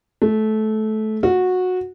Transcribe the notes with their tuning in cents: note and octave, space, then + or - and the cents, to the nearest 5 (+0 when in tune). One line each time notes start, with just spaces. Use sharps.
A3 -20
F#4 -15